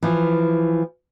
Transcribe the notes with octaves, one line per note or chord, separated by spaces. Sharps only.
E3 F3